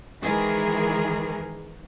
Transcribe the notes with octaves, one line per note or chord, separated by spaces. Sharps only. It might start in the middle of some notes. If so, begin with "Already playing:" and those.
D#3 E3 G#3 G#4 A#4